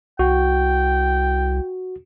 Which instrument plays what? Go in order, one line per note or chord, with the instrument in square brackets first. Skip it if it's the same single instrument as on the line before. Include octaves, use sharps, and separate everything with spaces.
[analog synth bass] C2 [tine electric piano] F#4 [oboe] G5